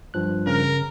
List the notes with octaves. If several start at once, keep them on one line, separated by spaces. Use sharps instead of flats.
G2 F3 F#6
C#3 A#4